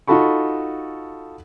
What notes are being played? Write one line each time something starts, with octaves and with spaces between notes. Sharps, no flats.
D#4 F4 F#4 A4 B5 C#6